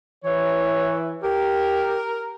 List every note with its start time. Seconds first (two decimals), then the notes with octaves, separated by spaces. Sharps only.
0.24 E3 C#5
1.23 G4 A#4